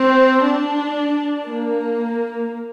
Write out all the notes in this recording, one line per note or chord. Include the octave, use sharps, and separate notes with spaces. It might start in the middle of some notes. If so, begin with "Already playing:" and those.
Already playing: C4
D4
A#3